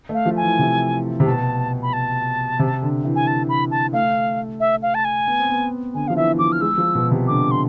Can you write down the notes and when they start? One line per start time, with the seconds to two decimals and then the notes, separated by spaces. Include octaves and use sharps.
0.09 A3
0.14 F5
0.26 F3
0.37 G#5
0.42 E3
0.59 C3
1.20 C3
1.26 B2 A5
1.82 B5
1.93 A5
2.59 C3
2.82 D3
3.04 E3
3.16 G#5
3.27 A5
3.49 B5
3.71 A5
3.93 A3 F5
4.60 E5
4.82 F5
4.95 A5
5.05 G#5
5.27 B3
5.39 C4
5.49 B3
5.94 D3 G#5
6.08 F3 F5
6.16 E3 E5
6.39 F3 D6
6.52 F6
6.61 G#3 E6
6.78 F3
6.95 B2
7.11 C3
7.27 D3 D6
7.51 C6